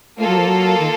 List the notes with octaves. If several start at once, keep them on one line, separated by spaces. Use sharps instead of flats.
A3 A#3 F4 A4
F#3
F3
F#3
D#3